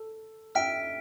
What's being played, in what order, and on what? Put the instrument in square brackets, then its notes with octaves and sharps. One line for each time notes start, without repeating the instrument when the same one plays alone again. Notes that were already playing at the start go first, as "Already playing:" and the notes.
Already playing: [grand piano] A4
[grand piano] E5 G5 [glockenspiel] F6 B6 D7